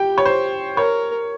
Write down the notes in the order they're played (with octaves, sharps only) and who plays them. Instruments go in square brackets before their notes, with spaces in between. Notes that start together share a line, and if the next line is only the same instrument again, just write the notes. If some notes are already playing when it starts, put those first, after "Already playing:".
Already playing: [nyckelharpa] G4 [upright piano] G5
[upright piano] C#5
C5
[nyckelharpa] A#4 [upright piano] C#5